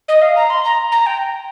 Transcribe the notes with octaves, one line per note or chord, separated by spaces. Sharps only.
D#5
F5
A#5
C6
A#5
A#5
G5